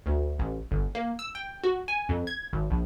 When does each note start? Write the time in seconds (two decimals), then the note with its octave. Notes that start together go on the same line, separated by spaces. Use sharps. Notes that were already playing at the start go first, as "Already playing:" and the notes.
0.06 D2
0.39 A1
0.71 G1
0.95 A#3
1.19 E6
1.35 G5
1.64 F#4
1.88 G#5
2.09 F2
2.27 G#6
2.53 G#1
2.70 A#1